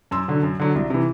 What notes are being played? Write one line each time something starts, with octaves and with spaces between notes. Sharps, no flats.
F#2 C6 E6
D3 F#3
F#2
D3 F#3
C2
C3 E3